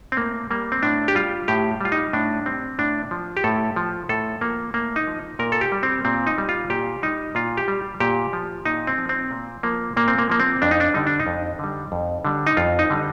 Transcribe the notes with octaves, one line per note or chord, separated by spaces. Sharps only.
C4
A2 A#3
G3 A#3
C4
A2 D4
G4
G3 F4
A2 G4
G3 F4
D#4
A2 D4
G3 C4
A2 D4
F3
G4
A2 A4
F3
A2 A4
F3 A#3
A2 A#3
D#4
F3
A#2 A#4
A4
G4
G3
C4
A#2 C4
D#4
G3
F4
A#2 G4
G3 D#4
A#2 F4
G4
G3
A#2 G4
F3
A#2 D#4
C4
F3
C4
A#2
F3 A#3
A#2 A#3
C4
A#3
F3 A#3
C4
F2 D4
D#4
D4
D3 G3 D#4
D4
D#4
F2
D3 G3
F2
D3 G3
D#4
F2 F4
D#4
D3 G3